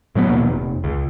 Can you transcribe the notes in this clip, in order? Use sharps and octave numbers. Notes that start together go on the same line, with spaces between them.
A2 F#3 G#3 B3
A#1 D#2 B2 A#3
F1
C#2